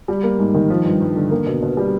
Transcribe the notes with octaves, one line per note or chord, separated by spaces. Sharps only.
G3
A#3
G#2
D#3
F3
G2
G2
D3
A#3
B2
B2
G3